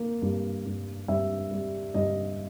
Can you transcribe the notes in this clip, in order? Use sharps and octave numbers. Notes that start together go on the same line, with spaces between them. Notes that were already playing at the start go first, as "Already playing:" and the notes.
Already playing: A#3
G2
G2
G2 E5
G3
G2 D#5